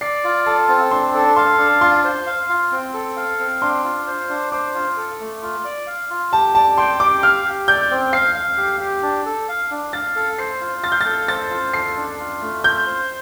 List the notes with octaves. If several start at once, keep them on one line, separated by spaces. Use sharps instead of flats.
D5 C7
F4
A4 A5
C4
D4 C6
A4
F5 C6
D4
F4 C6
C5
F5
F4
C4
A4
F5
C4
D4 C6
F4
C5
D4
C5 D6
F4
A4
A3
F4
D5
F5
F4
G4 A5
D5 A5
G5 C6
G4 D6
F5 F6
G4
D5 G6
C4
F5 C7
F5
G4
G4
D4
A4
F5
D4
F5 A6
A4
C5 C7
F4
F5 A6
G6
A4 A6
C5 A6
F4
A4 C7
D4
F4
A3
F4 G6
C5